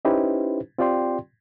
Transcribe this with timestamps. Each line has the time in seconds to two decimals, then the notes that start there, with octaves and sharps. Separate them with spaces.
0.05 C#4 D#4 E4 G4 B4 C5
0.78 C4 F4 G4 D5 G5 C6